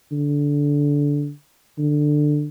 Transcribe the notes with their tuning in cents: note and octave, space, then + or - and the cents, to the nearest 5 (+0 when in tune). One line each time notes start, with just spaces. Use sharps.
D3 -15
D3 +15